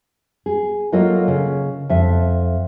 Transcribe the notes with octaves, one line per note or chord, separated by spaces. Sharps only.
G#4
F#3 A#3 F4 A4 D#5
C#3
F2 E5